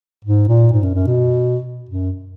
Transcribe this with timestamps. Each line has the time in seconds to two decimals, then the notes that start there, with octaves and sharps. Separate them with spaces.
0.25 G#2
0.48 A#2
0.72 G#2
0.83 F#2
0.95 F#2
1.07 B2
1.89 F#2